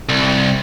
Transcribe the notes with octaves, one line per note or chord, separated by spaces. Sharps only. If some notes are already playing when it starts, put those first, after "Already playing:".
C2